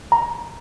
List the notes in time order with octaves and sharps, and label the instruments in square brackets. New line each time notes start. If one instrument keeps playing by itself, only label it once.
[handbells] A#5